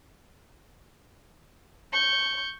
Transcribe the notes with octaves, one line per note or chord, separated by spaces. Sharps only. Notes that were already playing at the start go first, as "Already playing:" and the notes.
C#6 G6